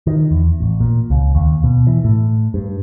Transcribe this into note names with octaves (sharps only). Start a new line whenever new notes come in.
D#3
E2
A1
A#2
C#2
D#2
B2
E3
A2
G2